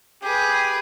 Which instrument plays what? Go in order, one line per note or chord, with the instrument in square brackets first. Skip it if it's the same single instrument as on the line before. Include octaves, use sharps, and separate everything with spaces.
[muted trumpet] G4 [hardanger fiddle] G#4 B4